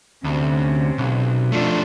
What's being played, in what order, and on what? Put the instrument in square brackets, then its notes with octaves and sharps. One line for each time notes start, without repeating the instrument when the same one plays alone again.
[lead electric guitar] D2 [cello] C3 C#4
[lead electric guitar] B1
[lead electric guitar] F3 A3 [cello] D4 F4